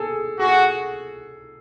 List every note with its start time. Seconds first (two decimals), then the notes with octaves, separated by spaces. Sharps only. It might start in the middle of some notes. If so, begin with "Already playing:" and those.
Already playing: G#4 A4
0.39 F#4 G#4